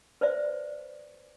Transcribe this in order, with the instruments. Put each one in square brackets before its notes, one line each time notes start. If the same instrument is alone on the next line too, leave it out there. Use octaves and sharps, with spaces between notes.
[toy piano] B4 C5 D5 E5